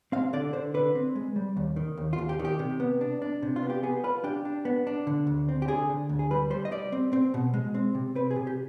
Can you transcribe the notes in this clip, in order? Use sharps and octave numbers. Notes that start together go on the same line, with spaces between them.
C4 F5
D3 D5
D3 C5
D3 B4
C4
G#3
G3
D#2
D#3
D#2
F4
D#2
G4
D#3
G4
C3
B3
D4
D4
C3
F4
B3
G4
B3 G#4
F4 B4
D4 G4
D4
B3
D4
D3
D2
C4
G4
D3 G#4
D3
D2
G#4
G3 B4
G3 C5
D#5
G3 D5
C4
C4
B2
G#3
C4
C3
C4 B4
G#4
C3
G4